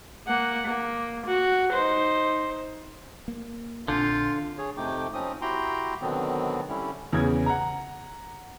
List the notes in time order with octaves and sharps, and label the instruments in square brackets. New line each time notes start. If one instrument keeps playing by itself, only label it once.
[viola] A#3 F#5
A#3
F#4
D#4 C5
[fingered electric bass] A#3
[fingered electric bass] A#1 [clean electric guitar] D3 [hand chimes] C4 D4 G6 [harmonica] F4
[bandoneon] G#4 C#5
F2 C3 A3 D#4 G5 D6
F3 C4 C#4 D#4 D#6
E4 F#4 G4 G5 A#5 C6
B2 D3 D#3 F#3 B3 C4
D3 G3 C#4 E4
[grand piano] E2 C#3 G#6
F#5 A#5